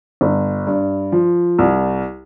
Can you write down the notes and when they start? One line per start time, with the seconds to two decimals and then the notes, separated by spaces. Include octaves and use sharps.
0.21 G1
0.67 G2
1.12 F3
1.59 C2